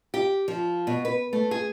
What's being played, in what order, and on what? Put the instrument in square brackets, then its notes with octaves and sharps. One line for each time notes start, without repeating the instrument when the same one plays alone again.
[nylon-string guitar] G4
F3
B2
B4
A3
G#4